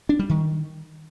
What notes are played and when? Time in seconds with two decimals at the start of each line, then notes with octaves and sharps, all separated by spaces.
0.09 D4
0.19 G3
0.29 D#3